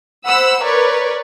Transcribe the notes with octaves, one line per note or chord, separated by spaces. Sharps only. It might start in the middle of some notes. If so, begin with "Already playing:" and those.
C5 F#5 B5 E6
A#4 B4 C#5 D5